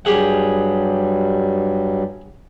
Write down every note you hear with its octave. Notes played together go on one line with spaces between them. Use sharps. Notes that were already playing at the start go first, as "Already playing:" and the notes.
G2 F#3 G3 G4 G#4 F#5